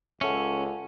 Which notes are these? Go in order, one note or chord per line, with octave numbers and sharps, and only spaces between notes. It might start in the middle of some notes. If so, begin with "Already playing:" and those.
C#2 C#4 A4 C#5 E5 F#5